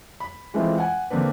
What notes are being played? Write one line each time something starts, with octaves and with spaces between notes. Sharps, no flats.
B5
E3 G#3 A3 C4 E4 F4
F#5 G#5
D3 A#3 C4 D4 B4